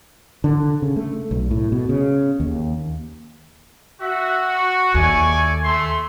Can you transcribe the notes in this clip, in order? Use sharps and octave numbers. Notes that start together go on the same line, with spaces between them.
D3
C#3
A3
B1
A2
B2
C#3
D#2
F#4 E5
C#6
D#2 A3 D5 G#5
A3 C6